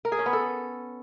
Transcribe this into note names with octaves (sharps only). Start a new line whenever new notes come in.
A#4
G#4
C#4
B3
A4